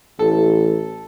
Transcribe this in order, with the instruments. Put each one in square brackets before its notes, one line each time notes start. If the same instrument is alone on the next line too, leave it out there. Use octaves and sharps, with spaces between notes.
[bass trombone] A1 [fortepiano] A4